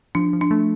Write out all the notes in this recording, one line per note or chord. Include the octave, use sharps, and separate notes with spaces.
F3 D4
F3
D4
A3